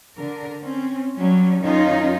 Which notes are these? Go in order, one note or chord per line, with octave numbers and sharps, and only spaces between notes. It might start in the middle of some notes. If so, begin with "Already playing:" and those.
D3 A#4
C4 C#4
F#3 G3 C#4
F#2 D#3 C#4 D#4 F4